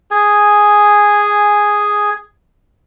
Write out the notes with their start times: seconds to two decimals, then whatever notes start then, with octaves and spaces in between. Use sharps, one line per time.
0.11 G#4 G#5